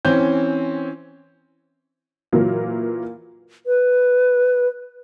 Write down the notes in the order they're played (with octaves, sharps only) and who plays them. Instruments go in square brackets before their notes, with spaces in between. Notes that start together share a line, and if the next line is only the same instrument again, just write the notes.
[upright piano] E3 C4 C#4 G6
[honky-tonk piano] A#2 E3 F#3 A#3
[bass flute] B4